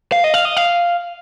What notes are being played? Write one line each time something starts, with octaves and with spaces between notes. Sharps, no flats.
F5
D#5
F5
D#5
F5